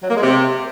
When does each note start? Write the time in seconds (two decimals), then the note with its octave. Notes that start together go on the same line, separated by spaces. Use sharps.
0.02 F#3
0.09 A#3
0.15 G#3
0.22 C3